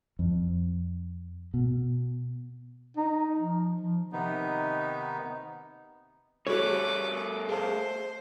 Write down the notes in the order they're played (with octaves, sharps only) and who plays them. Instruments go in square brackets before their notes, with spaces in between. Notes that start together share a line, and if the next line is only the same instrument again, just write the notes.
[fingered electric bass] F2
B2
[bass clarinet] D#4
F3
F3
[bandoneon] C3 D#3 B3 D#4
[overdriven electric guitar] G3 A3 [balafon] F#4 G#4 A4 [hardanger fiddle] B4 D6 [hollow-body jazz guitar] C#5
[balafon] G#4 F5 A5 [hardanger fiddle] C5